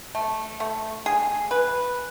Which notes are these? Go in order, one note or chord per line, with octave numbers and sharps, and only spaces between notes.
A3
A3
G#4
B4